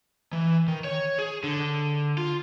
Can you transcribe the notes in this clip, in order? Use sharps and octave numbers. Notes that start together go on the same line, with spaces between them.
E3
D#3
C#5
G#4
D3
F4